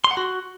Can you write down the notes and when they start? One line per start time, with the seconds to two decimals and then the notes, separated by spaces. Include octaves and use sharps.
0.04 C6
0.11 F#5
0.17 F#4